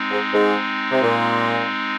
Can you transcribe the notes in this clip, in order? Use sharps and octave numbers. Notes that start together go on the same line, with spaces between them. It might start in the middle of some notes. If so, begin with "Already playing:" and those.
Already playing: G#3 C4 D#4
G#2
G#2
C3
A#2